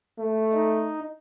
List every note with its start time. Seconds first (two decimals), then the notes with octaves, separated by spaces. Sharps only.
0.18 A3
0.53 D#4